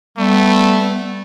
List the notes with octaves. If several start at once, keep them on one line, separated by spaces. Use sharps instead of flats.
G3 A3 B3